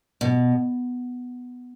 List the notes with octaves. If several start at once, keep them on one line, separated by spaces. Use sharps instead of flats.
B2